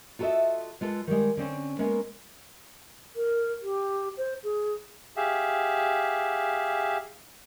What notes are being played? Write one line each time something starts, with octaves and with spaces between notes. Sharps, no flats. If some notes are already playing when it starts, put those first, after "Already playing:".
F4 F#4 A4 A#4 D#5 E5
G#3 F4 A4 B4
D#3 G3 G#3
D3 C4 C#4
G#3 A#3 B3 C#4
A#4
G4
C5
G#4
G4 G#4 E5 F5